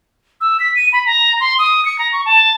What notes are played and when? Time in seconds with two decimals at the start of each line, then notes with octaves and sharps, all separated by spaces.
0.41 E6
0.60 B6
0.76 D#7
0.93 B5
1.06 A#5
1.40 C6
1.59 D#6
1.85 C#7
1.99 A#5
2.13 C#6
2.26 A5